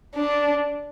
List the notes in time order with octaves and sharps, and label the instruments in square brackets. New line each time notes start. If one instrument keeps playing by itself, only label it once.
[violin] D4